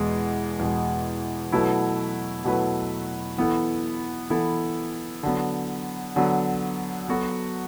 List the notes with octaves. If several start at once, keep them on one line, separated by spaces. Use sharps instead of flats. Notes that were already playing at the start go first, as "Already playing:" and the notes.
Already playing: E2 B2 G#3
E2 B2 G#3
B2 F#3 A3 E4 B4
B2 F#3 A3 E4 B4
E3 B3 E4 A4
E3 B3 E4 A4
D3 F#3 B3
D3 F#3 B3
F#3 B3 F#4 A4